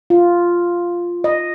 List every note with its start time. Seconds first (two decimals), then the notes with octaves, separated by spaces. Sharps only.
0.10 F4
1.24 D#5